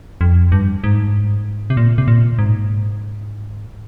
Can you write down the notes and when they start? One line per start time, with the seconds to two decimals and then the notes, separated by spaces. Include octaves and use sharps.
0.21 F2
0.52 G2
0.84 G#2
1.70 C3
1.77 A#2
1.98 C3
2.08 A#2
2.39 G#2